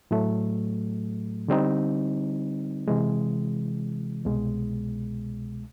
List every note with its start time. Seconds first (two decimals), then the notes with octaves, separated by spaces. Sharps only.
0.11 A2 F#3 A3
1.48 D3 G3 C4 D#4
2.88 C3 E3 G#3
4.25 C2 B2 G#3